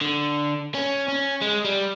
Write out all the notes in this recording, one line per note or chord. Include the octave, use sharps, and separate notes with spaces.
D3
C#4
C#4
G#3
G3